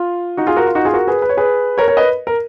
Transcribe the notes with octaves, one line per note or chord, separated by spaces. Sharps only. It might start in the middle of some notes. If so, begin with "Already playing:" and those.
Already playing: F4
D#4 F#4
F4 G#4
F#4 A#4
F4
D#4 F#4
F4 G#4
F#4 A#4
G#4 B4
B4
C#5
G#4 B4
A#4 C#5
A#4 C#5
B4 D#5
A#4